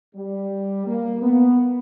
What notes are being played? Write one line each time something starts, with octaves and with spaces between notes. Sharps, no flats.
G3
A#3
B3